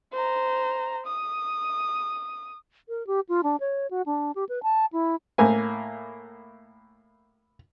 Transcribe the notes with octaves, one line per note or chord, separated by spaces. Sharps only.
C5 A#5
D#6
A#4
G4
F4
D4
C#5
F#4
D4
G4
B4
A5
E4
A2 A#3 G#5